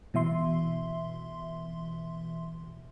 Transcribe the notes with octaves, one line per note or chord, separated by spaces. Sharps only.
B2 E3 E5 C6